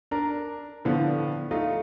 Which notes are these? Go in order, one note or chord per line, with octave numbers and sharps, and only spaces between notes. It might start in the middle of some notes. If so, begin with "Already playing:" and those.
D4 A#4
A2 D3 F3 B3
A3 D#4 F4